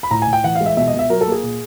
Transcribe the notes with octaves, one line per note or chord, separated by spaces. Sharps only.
B5
A2 A#5
G#5
A2
G5
E3 F#5
F5
G#3
E5
B2 E5
D#5
B2
E5
F#3 A#4
A4
A#3
G#4
A#2